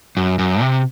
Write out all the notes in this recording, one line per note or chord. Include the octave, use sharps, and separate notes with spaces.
F#2
F#2
C3